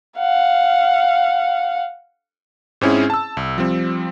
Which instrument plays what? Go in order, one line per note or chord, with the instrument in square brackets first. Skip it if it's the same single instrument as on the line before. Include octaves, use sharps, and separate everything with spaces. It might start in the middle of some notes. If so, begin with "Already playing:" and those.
[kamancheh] F5 F#5
[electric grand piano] G#2 C4 C#4 E4 G#4
A5 E6
C2
F3 G3 C4